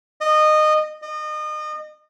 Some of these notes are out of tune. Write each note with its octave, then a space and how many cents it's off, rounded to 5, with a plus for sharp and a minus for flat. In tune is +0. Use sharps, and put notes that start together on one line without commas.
D#5 -20
D#5 -30